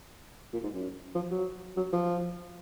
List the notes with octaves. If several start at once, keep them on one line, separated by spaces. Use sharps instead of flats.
A#2
G#2
F#2
F3
F#3
F#3
F3